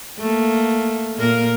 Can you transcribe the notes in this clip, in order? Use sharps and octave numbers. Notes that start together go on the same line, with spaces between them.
A3 A#3
A#2 A#3 A#4